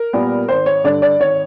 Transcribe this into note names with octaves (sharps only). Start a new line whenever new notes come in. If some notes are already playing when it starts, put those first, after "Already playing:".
Already playing: A#4
A#2 G3 B3
G#1 C5
C#5
G2 D3 D5
D5
G#1 C#5